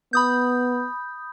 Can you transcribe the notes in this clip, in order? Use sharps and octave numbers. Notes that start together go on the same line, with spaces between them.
B3 B5 D#6 G6